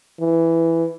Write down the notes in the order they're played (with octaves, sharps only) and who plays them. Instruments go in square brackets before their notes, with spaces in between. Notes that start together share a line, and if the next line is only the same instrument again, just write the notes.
[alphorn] E3